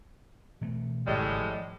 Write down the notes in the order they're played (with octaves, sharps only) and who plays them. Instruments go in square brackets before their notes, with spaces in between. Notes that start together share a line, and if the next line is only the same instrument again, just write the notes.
[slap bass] B2 E3 A3
[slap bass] G#1 C#3 [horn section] A2 G3 G#3
[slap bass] F3